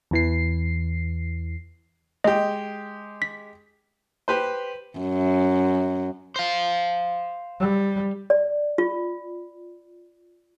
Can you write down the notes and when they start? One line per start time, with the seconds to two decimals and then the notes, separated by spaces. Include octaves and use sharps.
0.11 E2 E3 C7
2.24 G#3 G4 D#5
3.22 B6
4.28 G4 B4 C5
4.99 F#2
6.36 C5 F5
7.60 G3
8.30 D5
8.78 F4